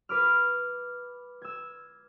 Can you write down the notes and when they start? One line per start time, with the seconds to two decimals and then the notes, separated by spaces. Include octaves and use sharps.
0.09 B4 D6 F6
1.42 E6 G#6